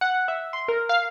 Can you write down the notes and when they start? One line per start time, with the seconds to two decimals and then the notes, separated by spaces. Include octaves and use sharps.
0.01 F#5
0.28 E5
0.53 C6
0.68 A#4
0.89 F5